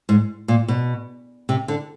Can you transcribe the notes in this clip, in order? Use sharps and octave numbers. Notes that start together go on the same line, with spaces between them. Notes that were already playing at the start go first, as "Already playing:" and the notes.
G#2
A#2
B2
C3
D3